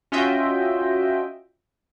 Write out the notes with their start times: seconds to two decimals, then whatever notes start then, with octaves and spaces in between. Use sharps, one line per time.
0.12 C#4 F4 F#4 D#5 E5 G5